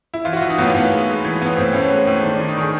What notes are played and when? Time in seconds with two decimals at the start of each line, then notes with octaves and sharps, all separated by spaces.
0.14 E4
0.25 E3 F4
0.33 F#4
0.37 F4
0.42 E3
0.50 D#4
0.58 A2 B3
0.62 A#3
0.74 A2 B3
0.91 G#3
1.08 G#3
1.24 E3
1.41 A2 B3
1.57 A2 C4
1.73 A2 C#4
1.91 G#3
2.07 A2
2.23 D#3 D4
2.36 D4
2.40 D#3
2.48 D#4
2.57 D#3 G#4